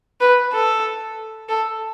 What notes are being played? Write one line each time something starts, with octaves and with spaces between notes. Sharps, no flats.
B4
A4
A4